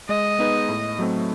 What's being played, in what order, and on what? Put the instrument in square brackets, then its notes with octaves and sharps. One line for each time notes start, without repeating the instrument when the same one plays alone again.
[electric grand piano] G#3 [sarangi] D#5
[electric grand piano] B3 D#4 G#4 B4
A2
F#3 A3 C4